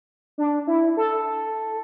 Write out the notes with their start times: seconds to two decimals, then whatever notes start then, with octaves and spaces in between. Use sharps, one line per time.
0.38 D4
0.67 E4
0.97 A4